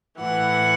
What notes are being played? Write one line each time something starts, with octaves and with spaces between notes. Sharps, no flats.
A2 E3 F#5